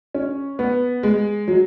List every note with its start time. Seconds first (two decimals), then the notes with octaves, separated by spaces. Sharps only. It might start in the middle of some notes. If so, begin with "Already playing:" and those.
0.14 C#4
0.59 B3
1.03 G#3
1.48 F#3